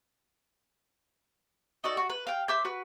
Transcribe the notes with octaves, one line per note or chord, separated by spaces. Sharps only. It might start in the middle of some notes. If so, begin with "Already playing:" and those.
D#4 F#4 A4 D5
F#4
B4
F5 G5
C5 E5 D6 G6
F#4 B4